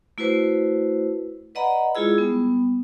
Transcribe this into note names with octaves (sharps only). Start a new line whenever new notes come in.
A3 E4 F#4 B4 C5
B4 D5 D#5 F#5 A#5 B5
G#3 E4 F4 G#4 E6
G3 B3